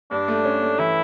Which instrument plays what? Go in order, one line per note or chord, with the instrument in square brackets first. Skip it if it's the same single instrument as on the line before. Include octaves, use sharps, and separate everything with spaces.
[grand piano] G2 [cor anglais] D4
[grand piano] A3
C#4
A3
[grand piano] E3 [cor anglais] E4